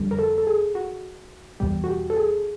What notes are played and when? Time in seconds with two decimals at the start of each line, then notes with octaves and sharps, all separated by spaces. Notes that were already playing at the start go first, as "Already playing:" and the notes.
Already playing: F2 D3 G3
0.11 A#4
0.19 A4
0.38 A4
0.47 G#4
0.75 F#4
1.60 E2 B2 G3 G4
1.84 F#4
1.88 G4
2.10 A4
2.16 G#4